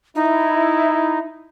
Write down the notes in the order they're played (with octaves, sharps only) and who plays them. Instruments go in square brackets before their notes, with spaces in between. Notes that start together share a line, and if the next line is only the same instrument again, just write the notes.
[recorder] D#4 [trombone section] E4